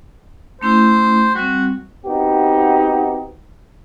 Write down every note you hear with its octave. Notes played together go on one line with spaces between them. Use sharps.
A3 C#4 E4 C5
G3 C4 F#4
B3 C4 D#4 F#4 G4